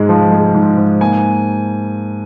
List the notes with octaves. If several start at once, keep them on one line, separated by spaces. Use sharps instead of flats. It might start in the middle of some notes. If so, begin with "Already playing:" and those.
Already playing: G#2 G#3
F3
G#3
G#2
G#2
A#3 G#5